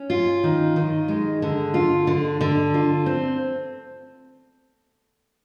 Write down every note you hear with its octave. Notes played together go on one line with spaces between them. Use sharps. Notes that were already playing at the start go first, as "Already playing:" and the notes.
Already playing: C#4
F4
D#3
D#3
G#3
D3
F4
D3
D3
F4
C4